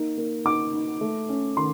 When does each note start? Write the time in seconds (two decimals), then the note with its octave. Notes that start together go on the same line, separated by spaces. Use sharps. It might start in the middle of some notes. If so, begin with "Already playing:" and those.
Already playing: A#3 D#4
0.18 A#3
0.45 D#4 D6
0.74 D#4
1.01 A3
1.29 C#4
1.57 D#3 C6